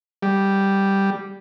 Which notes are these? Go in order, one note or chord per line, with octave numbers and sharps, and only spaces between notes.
G3